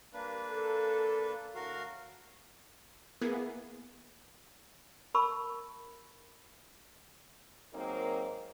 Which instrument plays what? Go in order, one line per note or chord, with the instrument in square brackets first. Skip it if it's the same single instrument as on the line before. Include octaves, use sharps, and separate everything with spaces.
[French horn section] G2 G3 A#4 [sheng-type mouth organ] A#3 D4 B4
[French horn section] A4
[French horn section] A2 D3 [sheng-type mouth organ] F#4 A#4 F5
[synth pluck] A#3 B3 E4 G#4
[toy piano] A#4 A5 B5 C#6 E6
[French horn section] G#2 F#3 A#3 C4 D#4 A#4